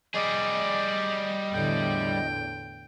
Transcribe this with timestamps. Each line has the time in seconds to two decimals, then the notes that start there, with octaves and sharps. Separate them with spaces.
0.14 G3 G#4 D5 D#5
1.53 E2 A2 D3 G5